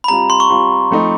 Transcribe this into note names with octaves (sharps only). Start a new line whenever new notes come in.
B5
G3 C4 F4 A#5
C6
C#6
G3 C4 F4
F3 A3 C4 D#4